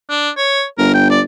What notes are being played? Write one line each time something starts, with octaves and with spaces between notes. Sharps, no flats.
D4
C#5
G1 A#4
G5
D5